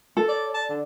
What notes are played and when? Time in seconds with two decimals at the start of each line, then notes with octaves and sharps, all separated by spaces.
0.17 A4 A#4
0.28 C#5 D5
0.54 D5 A5
0.69 D3